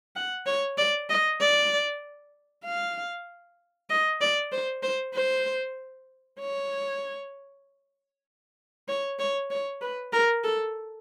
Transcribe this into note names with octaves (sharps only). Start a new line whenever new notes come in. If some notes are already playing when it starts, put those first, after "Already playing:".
F#5
C#5
D5
D#5
D5
F5
D#5
D5
C5
C5
C5
C#5
C#5
C#5
C#5
B4
A#4
A4